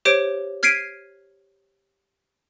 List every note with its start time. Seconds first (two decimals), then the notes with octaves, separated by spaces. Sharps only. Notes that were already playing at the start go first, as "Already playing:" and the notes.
0.05 G4 C5 C#5 D7
0.63 F6 G#6 B6 C7 D7 D#7